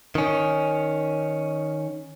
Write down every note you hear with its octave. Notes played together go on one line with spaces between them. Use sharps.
D#3 C#4